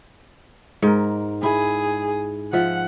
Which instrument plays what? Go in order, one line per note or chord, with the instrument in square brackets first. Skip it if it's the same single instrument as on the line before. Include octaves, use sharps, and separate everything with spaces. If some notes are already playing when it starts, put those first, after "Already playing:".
[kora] G#2 A#4
[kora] E4 [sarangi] G#4
[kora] F3 E5 [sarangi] F#5